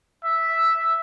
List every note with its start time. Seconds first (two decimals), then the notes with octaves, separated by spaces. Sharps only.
0.24 E5